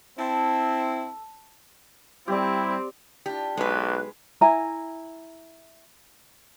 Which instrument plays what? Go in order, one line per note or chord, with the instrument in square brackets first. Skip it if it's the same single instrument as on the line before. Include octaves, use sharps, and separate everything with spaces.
[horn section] C4 E4 [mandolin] A4
[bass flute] G3 [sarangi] C4 [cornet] E4 [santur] G4 D5
[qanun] D4 E4 F4 [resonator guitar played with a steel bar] G4
[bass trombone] B1 [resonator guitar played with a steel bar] G#3 B4 [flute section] F#6
[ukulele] E4 G#5 A#5